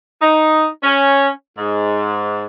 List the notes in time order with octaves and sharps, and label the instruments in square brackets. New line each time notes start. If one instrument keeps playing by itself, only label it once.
[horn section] D#4
C#4
G#2